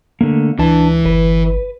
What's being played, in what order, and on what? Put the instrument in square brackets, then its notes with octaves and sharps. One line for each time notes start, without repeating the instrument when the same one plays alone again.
[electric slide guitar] D3 A3 A#3
[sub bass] C#2 [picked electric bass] E3 [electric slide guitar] D4 A5
[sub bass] G1 [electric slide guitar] B4